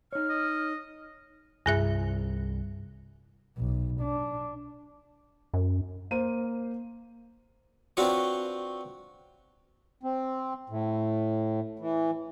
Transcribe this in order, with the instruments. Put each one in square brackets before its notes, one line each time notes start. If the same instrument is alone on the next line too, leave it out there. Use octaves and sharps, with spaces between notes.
[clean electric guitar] D#4 C#5 [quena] F6
[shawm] D#5
[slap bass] C2 [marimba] G2 G#4 E5
[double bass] B1
D4
[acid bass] F#2
[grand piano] A#3 C5 D#7
[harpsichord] C4 D4 F4 F#4 B4 C#5
[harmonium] C4
A2
E3